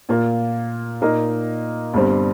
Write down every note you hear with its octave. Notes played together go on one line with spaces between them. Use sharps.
A#2 A#3 F4
A#2 A#3 D#4 A#4 D#5
G1 G2 G3 C4 G4